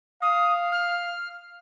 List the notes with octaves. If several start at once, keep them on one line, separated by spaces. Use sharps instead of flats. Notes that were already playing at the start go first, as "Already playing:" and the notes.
F5 D#6
F6